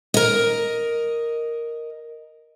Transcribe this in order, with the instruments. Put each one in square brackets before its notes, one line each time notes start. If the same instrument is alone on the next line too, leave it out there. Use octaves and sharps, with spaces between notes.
[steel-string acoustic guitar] A#4 D#5